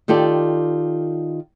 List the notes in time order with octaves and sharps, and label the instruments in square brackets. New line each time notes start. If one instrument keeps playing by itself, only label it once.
[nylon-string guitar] D#3 F4 G4 A4 D5